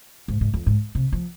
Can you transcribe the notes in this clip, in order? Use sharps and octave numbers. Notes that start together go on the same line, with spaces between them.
G#2
G#2
F2
G#2
C3
F3